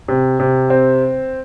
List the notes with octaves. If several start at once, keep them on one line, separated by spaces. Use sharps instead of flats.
C3
C3
C4